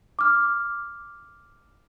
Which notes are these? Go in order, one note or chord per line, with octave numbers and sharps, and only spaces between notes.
D6 F6